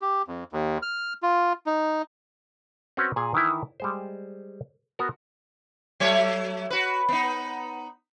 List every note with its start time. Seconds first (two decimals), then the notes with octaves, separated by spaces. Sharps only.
0.02 G4
0.28 F2
0.52 D#2
0.82 F6
1.23 F4
1.66 D#4
2.97 C4 C#4 F#4 B4 C#5
3.16 A#2 G#4 G#5
3.34 D#3 E3 E4
3.80 G3 G#3 C5
4.99 B3 F#4 A#4
6.00 F#3 A3 C#5
6.70 F#4 B4
7.09 B3 D#4